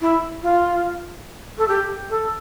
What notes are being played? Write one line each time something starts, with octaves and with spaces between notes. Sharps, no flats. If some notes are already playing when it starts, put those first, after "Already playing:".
E4
F4
A4
G4
A4